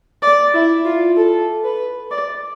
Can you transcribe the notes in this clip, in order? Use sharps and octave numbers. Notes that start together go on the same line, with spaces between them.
D5
E4
F4
A4
B4
D5